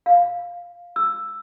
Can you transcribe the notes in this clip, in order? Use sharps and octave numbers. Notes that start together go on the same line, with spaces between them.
F5
E6